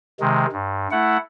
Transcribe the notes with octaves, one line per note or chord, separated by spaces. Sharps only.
C3 D#3 G#3
G2
A3 E4 F#5